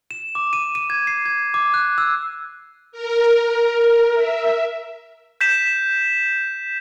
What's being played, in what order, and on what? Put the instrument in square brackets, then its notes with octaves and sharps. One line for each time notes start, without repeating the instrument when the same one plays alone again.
[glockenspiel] E7
D6
D#7
D#7
G#6
C7
G#6
D6
F#6
E6
[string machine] A#4
E5
[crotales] G6 B6 E7